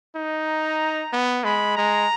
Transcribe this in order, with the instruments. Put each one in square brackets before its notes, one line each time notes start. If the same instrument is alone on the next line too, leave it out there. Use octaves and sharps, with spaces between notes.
[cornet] D#4
[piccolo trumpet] A#5
[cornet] B3
[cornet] G#3 [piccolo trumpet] B5
[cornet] G#3 [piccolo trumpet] A#5